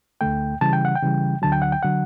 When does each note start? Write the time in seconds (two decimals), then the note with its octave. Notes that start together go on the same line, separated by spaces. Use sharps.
0.21 D2 D3 A3 G5
0.61 C#3 E3 G3 A5
0.73 G5
0.85 F#5
0.96 G5
1.02 C#3 E3 G3
1.42 D2 D3 F#3 A5
1.52 G5
1.62 F#5
1.72 G5
1.83 D3 F#3 F#5